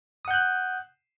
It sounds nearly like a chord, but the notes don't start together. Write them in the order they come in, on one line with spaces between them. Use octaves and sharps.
D#6 F#5 G6 F#6